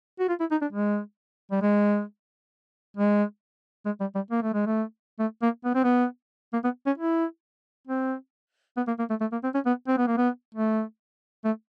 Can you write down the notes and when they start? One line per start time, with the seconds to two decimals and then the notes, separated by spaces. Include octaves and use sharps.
0.20 F#4
0.29 F4
0.40 E4
0.51 D#4
0.62 D4
0.73 G#3
1.51 G3
1.62 G#3
2.97 G#3
3.86 G#3
4.01 G3
4.15 G3
4.31 A#3
4.43 A3
4.54 G#3
4.66 A3
5.20 A3
5.42 A#3
5.65 B3
5.75 C4
5.84 B3
6.53 A#3
6.64 B3
6.87 C#4
6.98 E4
7.88 C4
8.77 B3
8.88 A#3
8.99 A#3
9.10 A3
9.21 A3
9.32 A#3
9.44 C4
9.55 C#4
9.66 B3
9.88 C4
9.98 B3
10.07 A#3
10.17 B3
10.55 A3
11.45 A3